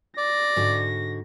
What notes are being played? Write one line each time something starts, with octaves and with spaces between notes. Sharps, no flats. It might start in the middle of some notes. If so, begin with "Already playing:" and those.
D5 A#6
G#2 D3 F#4